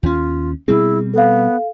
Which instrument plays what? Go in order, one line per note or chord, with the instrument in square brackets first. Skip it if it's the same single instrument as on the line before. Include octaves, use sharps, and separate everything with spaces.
[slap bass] D#2 C#4 [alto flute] F4
[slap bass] B2 G3 C4 [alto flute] E4 [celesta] G#4
[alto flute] B3 [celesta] A4 F5